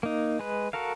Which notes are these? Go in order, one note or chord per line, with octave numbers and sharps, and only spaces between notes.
A#3 D#4
G#3 B4
F#4 A4 A#4 F5